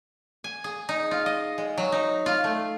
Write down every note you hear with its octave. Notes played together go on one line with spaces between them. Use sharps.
G#5
G#4
D#4
F4
D#5
G#3
F#3
D#4
F4
A3